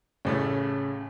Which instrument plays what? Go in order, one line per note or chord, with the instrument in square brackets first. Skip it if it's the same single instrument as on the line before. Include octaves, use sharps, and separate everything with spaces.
[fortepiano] A1 A2 A3 [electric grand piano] C#3